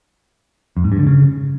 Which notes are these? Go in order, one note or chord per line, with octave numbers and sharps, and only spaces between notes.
F2
G#2
G2
D3
C#3